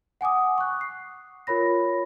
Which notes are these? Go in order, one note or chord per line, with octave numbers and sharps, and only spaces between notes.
F#5 G#5 D6 D#6
C#6 F#6
C7
F4 A#4 C#5 B5 A#6